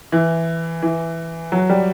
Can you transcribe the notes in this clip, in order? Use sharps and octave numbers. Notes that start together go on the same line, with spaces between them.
E3
E3
F#3
G3